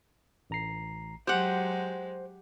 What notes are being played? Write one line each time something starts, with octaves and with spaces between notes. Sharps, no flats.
A1 A#5 C7
F#3 G#3 F#4 G4 C5 F#5